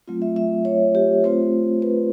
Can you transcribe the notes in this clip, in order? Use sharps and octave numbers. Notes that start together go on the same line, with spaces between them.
F#3 A3 C4 F4
E5
E5
C#5
G4
A3 C4 F4 C5
B4